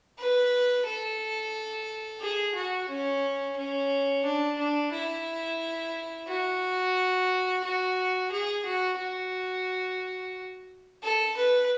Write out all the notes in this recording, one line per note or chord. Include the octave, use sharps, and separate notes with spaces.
B4
A4
G#4
F#4
C#4
C#4
D4
D4
E4
F#4
F#4
G#4
F#4
F#4
A4
B4